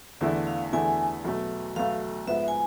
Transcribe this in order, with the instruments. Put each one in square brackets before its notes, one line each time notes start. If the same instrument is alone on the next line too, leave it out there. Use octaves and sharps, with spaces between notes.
[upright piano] E2 D3 A3 E4
[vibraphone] F5
[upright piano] E2 D3 A3 E4 [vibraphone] G#5
[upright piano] B1 B2 A3
[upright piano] B1 B2 A3 [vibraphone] F5
[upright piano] G#2 F3 B3 [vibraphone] E5
[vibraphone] G#5